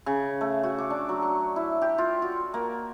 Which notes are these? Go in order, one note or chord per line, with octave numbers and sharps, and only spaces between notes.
C#3
A3
F#4
D6
D4
F#3
C#6
E4
G4
F4
F#4
A#3